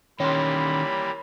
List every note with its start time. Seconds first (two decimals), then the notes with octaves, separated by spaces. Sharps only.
0.20 D#3 E3 G3 A#3 C#4 C#5 B5 C6